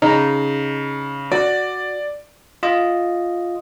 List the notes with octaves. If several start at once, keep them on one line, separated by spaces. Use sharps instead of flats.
C#3 D#4
F#4 D5
F4 D#5